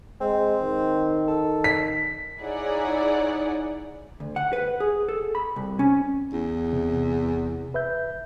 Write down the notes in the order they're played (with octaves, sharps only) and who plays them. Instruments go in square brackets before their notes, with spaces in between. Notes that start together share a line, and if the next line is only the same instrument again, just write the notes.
[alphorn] G#3 [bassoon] C4
[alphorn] D#3
[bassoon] A4
[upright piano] B6
[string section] D#4 E4 G#4 C#5 D5 F#5
[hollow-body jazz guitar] D2
F#5
B4
G#4
A4
B5
C2
C#4
[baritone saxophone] E2
[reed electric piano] C3
B4 E5 G6